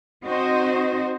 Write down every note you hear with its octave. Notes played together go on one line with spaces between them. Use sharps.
C4 D#4 F#4 C5 D#5